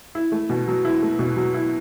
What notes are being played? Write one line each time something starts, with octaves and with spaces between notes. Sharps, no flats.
E4
A3
B2
F#3
E4
A3
B2
F#3
E4